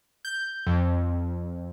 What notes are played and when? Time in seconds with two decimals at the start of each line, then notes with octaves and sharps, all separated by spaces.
0.25 G6
0.66 F2